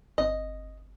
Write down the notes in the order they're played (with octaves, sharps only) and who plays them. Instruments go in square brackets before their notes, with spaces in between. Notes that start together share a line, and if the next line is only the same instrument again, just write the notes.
[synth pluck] G1 C4 [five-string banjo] D#5